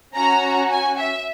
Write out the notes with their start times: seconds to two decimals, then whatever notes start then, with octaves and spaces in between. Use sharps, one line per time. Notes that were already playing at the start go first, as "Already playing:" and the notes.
0.14 C#4 F#4 A#5
0.70 G#5
0.98 E5